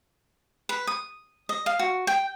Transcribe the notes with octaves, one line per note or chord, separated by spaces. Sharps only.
B4
D#6
D#5
F5
F#4
G5